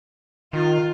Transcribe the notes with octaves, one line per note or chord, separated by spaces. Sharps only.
D#3 F4